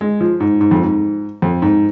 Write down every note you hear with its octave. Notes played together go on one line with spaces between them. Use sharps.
G#3
F3
G#2
G#2
F2
G#2
F2
G#2